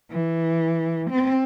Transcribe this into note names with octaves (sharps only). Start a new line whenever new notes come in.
E3
C4